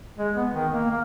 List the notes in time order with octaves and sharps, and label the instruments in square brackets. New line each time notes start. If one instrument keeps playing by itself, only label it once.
[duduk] G#3
B3
D#3
A#3
A#3